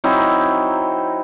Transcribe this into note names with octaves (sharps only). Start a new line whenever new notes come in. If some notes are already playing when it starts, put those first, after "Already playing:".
F#3 C4 D#4 E4